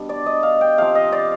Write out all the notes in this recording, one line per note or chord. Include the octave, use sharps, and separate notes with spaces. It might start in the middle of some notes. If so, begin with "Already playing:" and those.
Already playing: B2 G3 D4
D5
D#5
F5
G5
C3 F3 C4 F5
D#5
D5